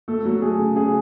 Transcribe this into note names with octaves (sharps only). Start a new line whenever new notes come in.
A3 A4
F#3
A3 G#4
C#3
C#3 G#4